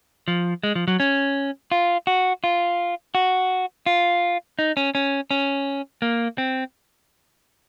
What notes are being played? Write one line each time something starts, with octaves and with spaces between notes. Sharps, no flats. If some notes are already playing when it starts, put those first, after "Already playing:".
F3
G#3
F3
F#3
C#4
F4
F#4
F4
F#4
F4
D#4
C#4
C#4
C#4
A#3
C4